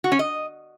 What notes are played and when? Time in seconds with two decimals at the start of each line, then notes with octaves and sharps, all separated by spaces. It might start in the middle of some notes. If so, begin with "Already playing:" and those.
0.04 F#4
0.12 C#4
0.19 D#5